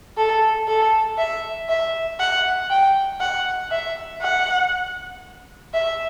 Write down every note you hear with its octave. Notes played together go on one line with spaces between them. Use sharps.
A4
A4
E5
E5
F#5
G5
F#5
E5
F#5
E5